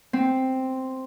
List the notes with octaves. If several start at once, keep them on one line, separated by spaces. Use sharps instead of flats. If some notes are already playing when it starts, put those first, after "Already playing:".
C4